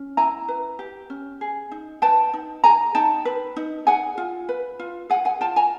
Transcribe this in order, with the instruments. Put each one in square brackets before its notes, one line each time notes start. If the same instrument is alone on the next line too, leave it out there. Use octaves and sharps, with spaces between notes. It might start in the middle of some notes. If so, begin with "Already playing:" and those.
Already playing: [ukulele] C#4
E4 G#5 A#5
B4
G4
C#4
G#4
D#4
B4 G5 A5
D#4
G#4 G#5 A#5
D#4 G5 A5
B4
D#4
G#4 F#5 G#5
F4
B4
F4
G#4 F#5 G#5
F#5 G#5
F4 G5 A5
G#5 A#5